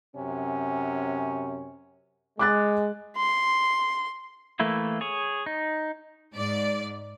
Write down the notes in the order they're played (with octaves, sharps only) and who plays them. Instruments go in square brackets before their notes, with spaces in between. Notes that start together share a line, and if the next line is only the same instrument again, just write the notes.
[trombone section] F#2 C3 C#4
[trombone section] G#3 [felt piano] D6 F#6 A6
[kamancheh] C6
[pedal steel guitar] E3 A3 A#3 E4
G#4 C#5
D#4
[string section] G#2 D5